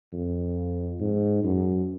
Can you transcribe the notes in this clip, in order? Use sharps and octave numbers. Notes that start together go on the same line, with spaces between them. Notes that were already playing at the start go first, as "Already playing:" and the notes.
F2
G#2
F#2